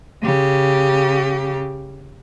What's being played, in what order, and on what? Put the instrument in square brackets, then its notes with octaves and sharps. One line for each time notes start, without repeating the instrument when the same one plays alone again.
[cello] C#3 G4